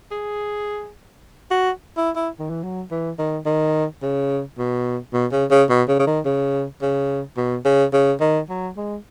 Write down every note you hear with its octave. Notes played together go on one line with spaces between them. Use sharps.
G#4
F#4
E4
E4
D#3
E3
F#3
E3
D#3
D#3
C#3
B2
B2
C#3
C#3
B2
C#3
C#3
D#3
C#3
C#3
B2
C#3
C#3
D#3
F#3
G#3